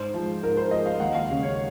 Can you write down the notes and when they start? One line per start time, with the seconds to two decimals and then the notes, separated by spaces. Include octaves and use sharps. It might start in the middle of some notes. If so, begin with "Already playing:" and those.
Already playing: G#2 C5
0.14 F3 G#3
0.43 G#2 A#4
0.57 C5
0.71 F3 G#3 D#5
0.86 F5
1.00 D#2 F#5
1.15 F5
1.29 C#3 G#3 C#4
1.43 C#5